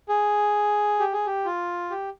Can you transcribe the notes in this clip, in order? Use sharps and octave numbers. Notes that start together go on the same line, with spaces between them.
G#4
G4
G#4
G4
F4
G4